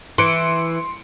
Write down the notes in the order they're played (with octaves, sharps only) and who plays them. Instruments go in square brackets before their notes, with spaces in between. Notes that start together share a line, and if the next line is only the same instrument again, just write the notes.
[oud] E3 [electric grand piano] C6 C#7 D7